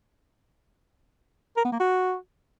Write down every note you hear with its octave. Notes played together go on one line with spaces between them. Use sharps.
A#4
B3
A#3
F#4